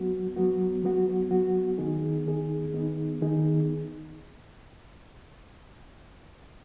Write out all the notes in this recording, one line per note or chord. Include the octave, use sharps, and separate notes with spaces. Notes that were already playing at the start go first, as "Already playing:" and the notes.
Already playing: F#3 B3 F#4
F#3 B3 F#4
F#3 B3 F#4
F#3 B3 F#4
D#3 B3 D#4 G#4
D#3 B3 D#4 G#4
D#3 B3 D#4 G#4
D#3 B3 D#4 G#4